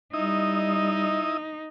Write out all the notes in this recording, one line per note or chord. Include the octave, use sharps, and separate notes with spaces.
G3 D#4 E4 D#5 D#6